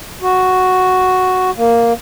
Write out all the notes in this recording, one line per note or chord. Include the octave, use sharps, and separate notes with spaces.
F#4
A#3